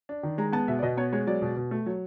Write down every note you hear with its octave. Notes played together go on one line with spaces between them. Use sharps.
D4
D#3
G#3 A#5
B3 A5
B2 E5
D5
B2 D#5
B3 C#5
G#3 C#5
F#3 D5
B2
B2
A3
F#3